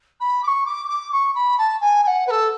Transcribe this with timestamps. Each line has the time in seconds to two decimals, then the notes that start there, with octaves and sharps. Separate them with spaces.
0.20 B5
0.42 D6
0.47 C#6
0.65 D6
0.88 D6
1.12 C#6
1.34 B5
1.58 A5
1.80 G#5
2.03 G#5
2.07 F#5
2.26 B4
2.30 A4